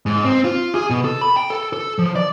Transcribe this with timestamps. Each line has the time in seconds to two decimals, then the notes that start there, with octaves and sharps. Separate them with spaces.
0.06 G#2
0.25 C4
0.44 F4
0.75 G#4
0.90 B2
1.05 A4
1.21 B5
1.37 G5
1.50 A4
1.73 A4
1.99 F3
2.16 D5